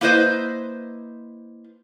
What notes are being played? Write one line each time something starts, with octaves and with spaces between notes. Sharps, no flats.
A#3 E4 B4 C5 D#5